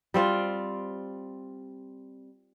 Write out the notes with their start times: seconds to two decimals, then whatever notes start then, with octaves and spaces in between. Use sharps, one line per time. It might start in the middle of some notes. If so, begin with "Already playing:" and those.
0.14 G3 C4 F4